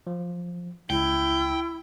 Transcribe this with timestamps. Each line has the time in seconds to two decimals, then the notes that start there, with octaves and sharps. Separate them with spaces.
0.07 F3
0.90 C#2 E4 G5